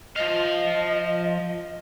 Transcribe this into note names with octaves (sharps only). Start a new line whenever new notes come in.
F3 D#5 F5